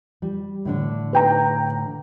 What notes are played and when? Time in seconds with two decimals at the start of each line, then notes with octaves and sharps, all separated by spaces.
0.22 G3
0.65 A2 D3 D4
1.13 B4 G5 A#5